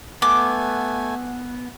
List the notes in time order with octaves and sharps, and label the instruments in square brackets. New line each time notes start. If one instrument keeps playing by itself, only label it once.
[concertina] A3 G#5 [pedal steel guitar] B3 [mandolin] D6